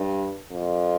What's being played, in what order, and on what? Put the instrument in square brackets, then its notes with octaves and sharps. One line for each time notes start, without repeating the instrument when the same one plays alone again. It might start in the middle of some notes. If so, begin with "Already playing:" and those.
Already playing: [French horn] G2
F2